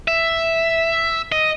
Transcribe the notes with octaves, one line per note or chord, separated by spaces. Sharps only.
E5
D#5